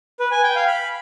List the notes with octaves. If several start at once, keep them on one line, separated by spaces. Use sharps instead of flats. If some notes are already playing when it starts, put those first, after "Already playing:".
B4
G#5
G5
F5
B5